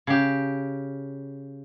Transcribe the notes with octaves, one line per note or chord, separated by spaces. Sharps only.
C#3 G4